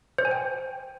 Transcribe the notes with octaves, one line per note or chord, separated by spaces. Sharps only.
C5
G#5
G5